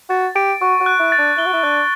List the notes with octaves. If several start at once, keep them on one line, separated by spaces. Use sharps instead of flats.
F#4 A6
G4 D7
F#4 C#6
F#4
F#6
E4
A6
D4
E4 G7
F#4
E4
D4 F#6